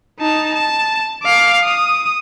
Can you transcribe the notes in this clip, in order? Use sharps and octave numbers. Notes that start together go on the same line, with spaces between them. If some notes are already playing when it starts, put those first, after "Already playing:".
D#4 A5
A5
F5 D6
D#6